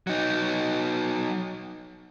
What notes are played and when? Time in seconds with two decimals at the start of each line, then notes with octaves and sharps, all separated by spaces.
0.07 F#3 D#4